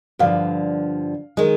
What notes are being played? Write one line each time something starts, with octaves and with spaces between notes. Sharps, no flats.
G2 D3 F3 F5
D#3 G#3